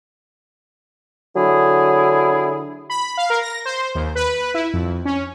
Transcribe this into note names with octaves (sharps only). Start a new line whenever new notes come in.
D3 F#3 E4 G#4
B5
F5
A#4
A#6
C5
D#2
B4
E4
F2
C#4